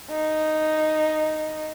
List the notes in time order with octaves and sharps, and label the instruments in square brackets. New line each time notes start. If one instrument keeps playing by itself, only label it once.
[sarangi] D#4